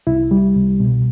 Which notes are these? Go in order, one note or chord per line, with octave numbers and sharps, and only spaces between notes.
C2 E4
G3
C2
B2